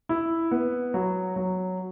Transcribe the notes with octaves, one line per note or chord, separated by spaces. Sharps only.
E4
B3
F#3
F#3